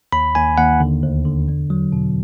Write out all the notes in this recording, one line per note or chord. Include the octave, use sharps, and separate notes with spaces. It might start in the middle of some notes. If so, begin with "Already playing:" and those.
D#2 B5
D#2 G#5
D#2 F#5
D3
D2
D3
E2
F#3
B2